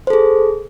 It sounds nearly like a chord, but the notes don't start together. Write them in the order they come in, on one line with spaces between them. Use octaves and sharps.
C5 A4 G#4